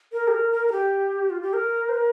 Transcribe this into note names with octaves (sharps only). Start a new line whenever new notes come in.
A#4
G4
A#4
A#4
A#4
G4
F4
G4
A#4
C5
A#4